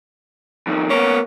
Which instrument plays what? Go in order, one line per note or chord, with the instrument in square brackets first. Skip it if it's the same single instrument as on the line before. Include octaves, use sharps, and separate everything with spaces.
[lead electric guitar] F2 D#3
[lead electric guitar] A#3 B3 [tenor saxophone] C#4